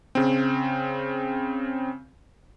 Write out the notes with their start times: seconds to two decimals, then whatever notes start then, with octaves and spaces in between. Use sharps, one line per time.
0.15 C#3 C4